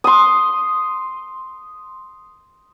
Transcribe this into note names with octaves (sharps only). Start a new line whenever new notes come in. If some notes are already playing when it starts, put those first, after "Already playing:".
C6 D#6